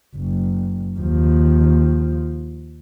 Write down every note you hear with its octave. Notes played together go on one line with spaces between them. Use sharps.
F#1
D#2 F3